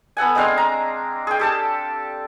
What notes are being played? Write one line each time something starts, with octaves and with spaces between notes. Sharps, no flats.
B3 A4 F#5 G#5
G#3 C4 D4 F5
A#5
G#4 G5
G4 A4 A5